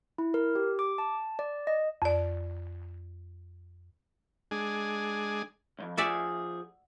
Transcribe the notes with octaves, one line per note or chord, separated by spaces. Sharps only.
E4
A#4
G4
D6
A5
D5
D#5
F2 D5
G#3 D4 G#4
C2 F2
F3 F#4 G#4 D5 E5